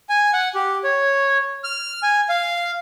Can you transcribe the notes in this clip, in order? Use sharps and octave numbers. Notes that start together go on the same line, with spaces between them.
G#5
F#5
G4
C#5
F6
G#5
F5